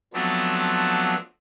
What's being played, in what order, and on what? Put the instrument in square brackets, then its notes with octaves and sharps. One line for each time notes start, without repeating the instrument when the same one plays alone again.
[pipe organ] F3 F#3 A3 B3 C4 D4